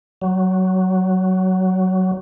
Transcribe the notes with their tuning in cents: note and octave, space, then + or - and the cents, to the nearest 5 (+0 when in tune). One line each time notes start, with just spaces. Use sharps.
F#3 +15